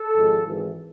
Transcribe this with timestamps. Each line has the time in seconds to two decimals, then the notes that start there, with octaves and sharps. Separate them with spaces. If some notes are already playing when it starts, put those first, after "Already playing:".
Already playing: A4
0.14 G#1 G#2 F3 G#3
0.44 G#1 G#2 E3